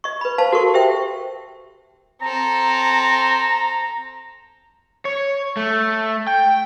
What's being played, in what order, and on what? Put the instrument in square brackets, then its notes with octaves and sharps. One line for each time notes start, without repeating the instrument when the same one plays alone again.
[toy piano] D#5 C#6
B4 B5
C5 F5 A5
F#4 A4 A#4 C#6
G4 C5 E5 G5
[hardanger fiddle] C4 A4 [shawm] A#5
[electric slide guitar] C#5
A3
G5